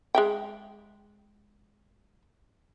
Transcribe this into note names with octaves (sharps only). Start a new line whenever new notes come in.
G#3 E5 G5